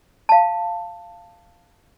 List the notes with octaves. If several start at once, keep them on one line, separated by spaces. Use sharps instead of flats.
F5 A5